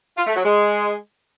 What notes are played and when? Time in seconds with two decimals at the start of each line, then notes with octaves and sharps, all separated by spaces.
0.17 F4
0.26 A3
0.35 F#3
0.44 G#3